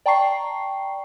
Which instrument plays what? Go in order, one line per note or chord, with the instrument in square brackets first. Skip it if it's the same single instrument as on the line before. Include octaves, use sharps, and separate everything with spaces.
[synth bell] D5 G5 A5 A#5 C#6 C7